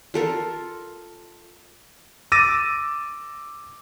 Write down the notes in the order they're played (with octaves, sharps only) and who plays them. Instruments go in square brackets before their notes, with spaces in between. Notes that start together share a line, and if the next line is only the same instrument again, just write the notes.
[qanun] F4 A4 A#4
[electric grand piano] D6 E6 A6 A#6 D#7